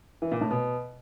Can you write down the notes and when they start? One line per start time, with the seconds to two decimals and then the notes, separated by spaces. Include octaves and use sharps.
0.22 E3
0.31 A#2
0.41 A2
0.51 B2